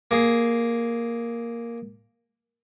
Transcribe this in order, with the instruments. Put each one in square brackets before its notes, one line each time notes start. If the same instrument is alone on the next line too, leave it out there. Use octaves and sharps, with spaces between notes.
[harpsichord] A#3 G#4